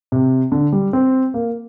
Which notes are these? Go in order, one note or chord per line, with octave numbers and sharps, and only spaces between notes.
C3
D3
G3
C4
A#3